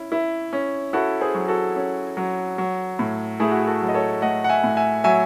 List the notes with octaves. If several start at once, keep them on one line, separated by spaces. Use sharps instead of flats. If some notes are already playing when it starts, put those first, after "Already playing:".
Already playing: C#4 E4
E4
C#4
E4 F#4 A4
G#4 C5
F#3
F#4 A4
C#4
F#3
F#3
A2
A3 E4 G#4
F#4
G#4
F#4 A4
F#3
D#5
A4 C#5
A3 D#5 F#5
F#5
E5 G#5
A2
E5 G#5
F#3 E5 G#5